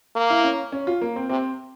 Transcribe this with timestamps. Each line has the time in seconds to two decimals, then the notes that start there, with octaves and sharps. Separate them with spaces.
0.16 A#3
0.30 E4
0.44 C#4
0.72 C#4
0.87 F4
1.01 A#3
1.16 C4
1.29 C3 C4